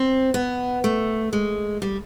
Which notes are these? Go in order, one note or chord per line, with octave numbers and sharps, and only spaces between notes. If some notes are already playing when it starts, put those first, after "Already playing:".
Already playing: C4
B3
A3
G#3
G3